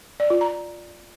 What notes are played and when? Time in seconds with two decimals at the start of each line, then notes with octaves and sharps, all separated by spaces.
0.20 D5
0.30 F4
0.41 A#5